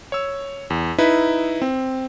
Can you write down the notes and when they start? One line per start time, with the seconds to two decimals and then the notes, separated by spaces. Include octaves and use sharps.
0.12 C#5 E6
0.70 E2
0.98 D#4 E4 B4 B6
1.62 C4